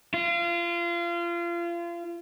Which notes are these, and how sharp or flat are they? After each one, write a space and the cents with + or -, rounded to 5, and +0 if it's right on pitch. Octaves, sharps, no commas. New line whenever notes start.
F4 -30